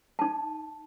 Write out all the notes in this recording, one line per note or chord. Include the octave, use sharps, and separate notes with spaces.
D#4 A5